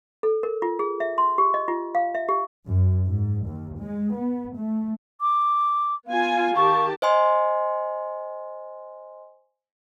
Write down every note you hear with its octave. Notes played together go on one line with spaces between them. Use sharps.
A4
A#4
F4
G#4
E5
C6
G4
D#5
F4
F5
E5
G4
F#2
G#2
D#2
G#3
B3
A3
D6
B3 F4 F5 G#5
D#3 G4 A5 C#6
C5 D#5 G#5 C6